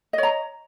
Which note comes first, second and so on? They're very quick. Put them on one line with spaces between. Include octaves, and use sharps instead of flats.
D#5 C#5 A#5